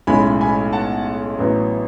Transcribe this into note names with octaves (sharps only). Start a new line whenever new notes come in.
B1 A2 G#3 C#4 E4 G#5 B5
G#5 B5
F#5 A5
A1 A2 F#3 B3